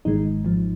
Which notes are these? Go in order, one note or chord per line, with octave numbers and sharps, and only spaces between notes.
G#1 G#2 D#3 G#3 D#4
G#1 G#2 F3